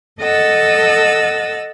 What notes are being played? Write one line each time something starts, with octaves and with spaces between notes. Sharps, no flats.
A4 D#5 F#5 E6 A6